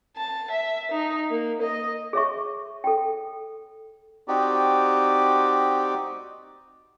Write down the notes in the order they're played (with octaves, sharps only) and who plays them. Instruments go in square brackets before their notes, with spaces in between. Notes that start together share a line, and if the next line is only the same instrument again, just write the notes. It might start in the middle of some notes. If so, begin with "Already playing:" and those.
[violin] A5
E5
D#4
A#3
D#5
[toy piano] G#4 C#5 E5 C#6
A4 G5
[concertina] C4 D#4 F#4 G4 D5